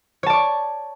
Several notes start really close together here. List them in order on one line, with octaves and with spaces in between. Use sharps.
C#5 A5 D5 C#6